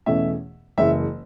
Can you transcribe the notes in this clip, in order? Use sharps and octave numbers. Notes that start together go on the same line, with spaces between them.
E2 B2 A3 C#4 E5
F#1 F#2 E3 G#3 E5